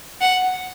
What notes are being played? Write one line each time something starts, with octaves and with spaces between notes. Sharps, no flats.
F#5